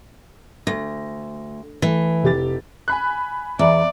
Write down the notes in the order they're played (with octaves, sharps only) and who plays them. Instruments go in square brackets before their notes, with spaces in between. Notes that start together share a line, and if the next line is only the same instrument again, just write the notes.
[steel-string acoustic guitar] D2 [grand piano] A#6
[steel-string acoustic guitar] E3 [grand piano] A3
[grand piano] F1 G4 A6
[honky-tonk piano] G#5 B5 F#6
[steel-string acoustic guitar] E2 [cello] D5 [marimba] E5 A#5